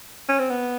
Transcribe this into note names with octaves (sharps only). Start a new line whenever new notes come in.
C#4
C4
B3